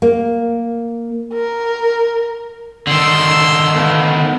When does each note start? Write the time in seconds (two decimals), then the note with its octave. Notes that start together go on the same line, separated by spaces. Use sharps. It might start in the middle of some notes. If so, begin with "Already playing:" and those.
0.02 A#3
1.33 A#4
2.87 D3 D#3 C6 E6
3.74 A3 B3 F5